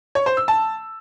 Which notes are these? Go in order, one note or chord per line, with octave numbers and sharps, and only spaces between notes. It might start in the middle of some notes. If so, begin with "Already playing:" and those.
C#5
C5
E6
A5